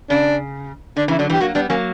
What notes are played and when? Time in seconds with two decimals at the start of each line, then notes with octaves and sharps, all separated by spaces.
0.10 C#3 D4
0.96 D3 D4
1.08 C#3 E3
1.11 E4
1.19 D3 F#3 D4
1.30 E3 G3
1.33 G4
1.40 F#3 A#3 F#4
1.55 G3 B3 D4
1.69 F#3 A#3 C#4